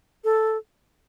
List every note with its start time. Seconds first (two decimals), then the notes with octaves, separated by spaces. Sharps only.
0.24 A4